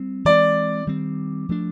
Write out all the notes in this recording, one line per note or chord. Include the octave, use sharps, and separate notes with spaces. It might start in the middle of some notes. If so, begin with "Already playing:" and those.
Already playing: G3 C4
E3 G#3 C4 D5
D#3 G3 C4
F3 A3 D4